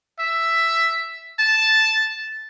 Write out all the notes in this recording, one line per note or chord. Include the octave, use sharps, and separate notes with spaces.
E5
A5